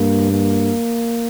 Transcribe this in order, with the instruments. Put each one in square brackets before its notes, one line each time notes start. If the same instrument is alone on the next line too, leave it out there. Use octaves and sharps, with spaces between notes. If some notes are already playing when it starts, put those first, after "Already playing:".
Already playing: [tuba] G2 [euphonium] A#3
[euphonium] A#3